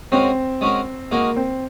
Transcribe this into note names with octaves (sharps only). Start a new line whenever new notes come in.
G#3 C4 C#4 F#4 A#4
G#3 C#4 F#4 A#4
G#3 A#3 D#4 F#4 A#4
C4